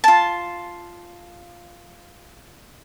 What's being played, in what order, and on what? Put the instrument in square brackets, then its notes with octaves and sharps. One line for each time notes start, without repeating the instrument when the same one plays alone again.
[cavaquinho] F4 A5